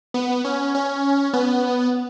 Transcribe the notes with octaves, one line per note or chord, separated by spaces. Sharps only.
B3
C#4
C#4
B3